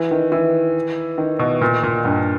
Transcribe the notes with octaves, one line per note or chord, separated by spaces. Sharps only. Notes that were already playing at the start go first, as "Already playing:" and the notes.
Already playing: E3
D#3
E3
D#3
B2
A#2
A#2
G2